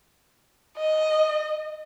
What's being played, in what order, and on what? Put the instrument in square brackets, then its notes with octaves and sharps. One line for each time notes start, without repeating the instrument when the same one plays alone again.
[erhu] D#5